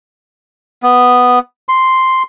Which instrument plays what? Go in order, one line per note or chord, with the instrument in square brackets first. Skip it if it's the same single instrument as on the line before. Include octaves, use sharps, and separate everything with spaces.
[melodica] B3
C6